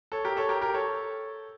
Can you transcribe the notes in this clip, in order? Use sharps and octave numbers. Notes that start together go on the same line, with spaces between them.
A4 C#5
G4 A#4
A4 C#5
G4 A#4
G4 A#4
A4 C#5